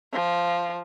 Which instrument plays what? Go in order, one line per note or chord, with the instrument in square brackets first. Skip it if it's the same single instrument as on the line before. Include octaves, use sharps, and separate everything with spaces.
[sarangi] F3